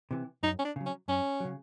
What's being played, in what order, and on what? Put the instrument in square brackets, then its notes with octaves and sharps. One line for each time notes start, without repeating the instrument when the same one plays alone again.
[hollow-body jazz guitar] C3 E3
[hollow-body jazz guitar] F#2 [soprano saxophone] D#4
[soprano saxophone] C#4
D4
[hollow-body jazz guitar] C#3 F#3
[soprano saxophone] C#4
[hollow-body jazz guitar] F#2 [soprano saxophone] C#4
[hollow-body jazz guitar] C#3 F#3